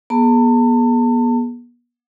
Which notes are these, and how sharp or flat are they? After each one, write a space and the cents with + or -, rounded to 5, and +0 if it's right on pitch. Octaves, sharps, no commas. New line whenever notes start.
B3 -40 G#4 +20 A5 +35